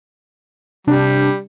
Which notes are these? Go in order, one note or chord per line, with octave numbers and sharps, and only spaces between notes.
C3 G3 D4